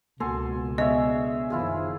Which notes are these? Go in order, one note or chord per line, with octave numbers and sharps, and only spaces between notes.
C#2 B2 A#3 F#4 A4 G#5 C6
B3 D4 G#4 C#5 D#5 E5
F#1 D#3 F3 E4 F4 G#4